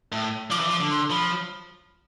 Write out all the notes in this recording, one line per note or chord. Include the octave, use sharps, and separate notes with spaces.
A2
F3 D6
E3
F3 D6
D3
C6
F3 B5